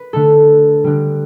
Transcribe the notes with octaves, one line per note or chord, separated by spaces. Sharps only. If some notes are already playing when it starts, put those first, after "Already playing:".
Already playing: B4
D3 A3 A4
D3 G3